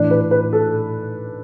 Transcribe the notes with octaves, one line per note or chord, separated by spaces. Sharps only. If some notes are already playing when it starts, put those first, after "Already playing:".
Already playing: A2 E3 D4 D5
B4
B4
A4